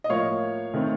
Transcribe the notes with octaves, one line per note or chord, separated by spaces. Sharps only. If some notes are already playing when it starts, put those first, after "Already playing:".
D#5
A2 F3 A#3 C#5 F5
D#3 A3 C4